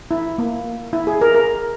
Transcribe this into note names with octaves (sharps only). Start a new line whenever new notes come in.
E4
A#3
E4
G#4
A#4
A#4